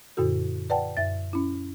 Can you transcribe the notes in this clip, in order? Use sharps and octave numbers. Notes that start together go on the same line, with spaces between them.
F#2 A#2 D3 F#4 A4
B4 D5 F#5 G5 A5
F#2 E5 A6
C#4 E4